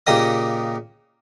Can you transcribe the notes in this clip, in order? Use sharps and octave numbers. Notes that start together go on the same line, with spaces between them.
A#2 C#3 A#3 G4 D#5 D#6